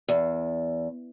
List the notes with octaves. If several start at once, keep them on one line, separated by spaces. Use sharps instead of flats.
E2